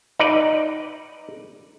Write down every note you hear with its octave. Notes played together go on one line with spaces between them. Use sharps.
D#4 B4 D5